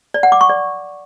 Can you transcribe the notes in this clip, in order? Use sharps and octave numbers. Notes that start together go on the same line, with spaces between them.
D5
F#5
D6
C#6
D5